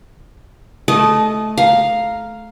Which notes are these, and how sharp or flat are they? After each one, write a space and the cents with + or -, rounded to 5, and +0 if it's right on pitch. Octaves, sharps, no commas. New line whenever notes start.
A3 -20 D#5 +0 A5 -30
F5 +0 A#5 +0